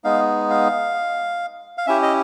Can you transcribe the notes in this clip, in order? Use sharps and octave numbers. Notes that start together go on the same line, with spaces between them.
G#3 B3 D#4 F5
F5
F5
C#4 E4 G4 E5
D#5